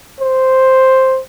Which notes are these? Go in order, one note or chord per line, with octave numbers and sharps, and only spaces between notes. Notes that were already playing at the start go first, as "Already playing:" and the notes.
C5